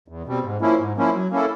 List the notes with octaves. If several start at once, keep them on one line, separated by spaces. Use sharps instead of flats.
E2
B2 G3 C4
G#2
F3 A#3 C#4 E4
G#2
F3 A#3 C#4 E4
F#3
A#3 C#4 E4 A4